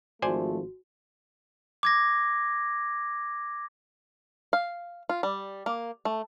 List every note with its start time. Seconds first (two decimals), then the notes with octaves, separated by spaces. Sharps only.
0.22 G#1 F3 A3 F#4 C5 D5 G#5
1.83 D6 G#6 A#6
4.53 F5
5.09 F4
5.23 G3
5.66 A#3
6.05 A3